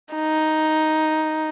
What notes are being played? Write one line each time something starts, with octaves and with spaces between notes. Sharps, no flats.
D#4